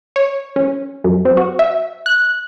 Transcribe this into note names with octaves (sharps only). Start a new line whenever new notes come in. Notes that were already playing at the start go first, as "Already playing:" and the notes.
C#5
C#4
F#2
C4
F#4
E5
F#6